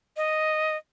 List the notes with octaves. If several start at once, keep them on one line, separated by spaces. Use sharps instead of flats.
D#5